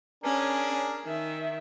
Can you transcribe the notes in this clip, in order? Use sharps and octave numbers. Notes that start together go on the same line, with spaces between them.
C#4 D4 G#4 A#4
D#3 E5